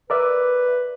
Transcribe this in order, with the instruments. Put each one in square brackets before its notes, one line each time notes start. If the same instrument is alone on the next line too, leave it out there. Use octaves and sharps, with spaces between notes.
[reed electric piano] A#4 D5 E5 [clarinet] B4